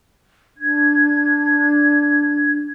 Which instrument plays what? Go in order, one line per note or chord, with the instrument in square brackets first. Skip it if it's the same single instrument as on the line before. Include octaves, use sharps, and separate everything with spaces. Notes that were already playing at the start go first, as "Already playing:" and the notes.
[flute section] D4 G#6